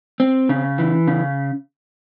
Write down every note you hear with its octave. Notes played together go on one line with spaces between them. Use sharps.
C4
C#3
E3
C#3